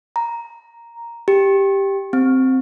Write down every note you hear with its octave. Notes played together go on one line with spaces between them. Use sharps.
A#5
G4
C4